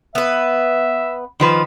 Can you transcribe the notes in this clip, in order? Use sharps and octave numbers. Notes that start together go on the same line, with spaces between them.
B3 B4 E5
D#3 F3 B4